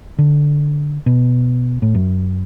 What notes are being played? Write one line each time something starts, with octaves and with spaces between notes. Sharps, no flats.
D3
B2
A2
F#2